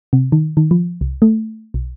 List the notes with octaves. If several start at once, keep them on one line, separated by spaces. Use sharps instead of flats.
C3
D#3
D#3
F3
C2
A3
B1